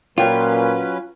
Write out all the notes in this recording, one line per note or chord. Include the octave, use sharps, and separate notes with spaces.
A#2 F#3 C#4 F4 B4 C5 G5 G#5